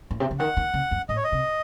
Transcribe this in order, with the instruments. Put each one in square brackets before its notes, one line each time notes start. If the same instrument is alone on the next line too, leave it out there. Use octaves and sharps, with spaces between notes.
[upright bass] A2
C3
C#3
[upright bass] D#3 [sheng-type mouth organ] F#5
[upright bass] D#3
C#3
F#2
[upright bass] A2 [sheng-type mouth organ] D#5
[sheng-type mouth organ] C#5
D#5
[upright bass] C3